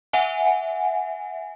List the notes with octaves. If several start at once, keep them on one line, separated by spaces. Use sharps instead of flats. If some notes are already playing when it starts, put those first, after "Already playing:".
E5 F#5 G#5